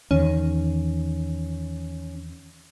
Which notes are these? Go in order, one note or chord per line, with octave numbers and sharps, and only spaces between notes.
E2 D#3 C#4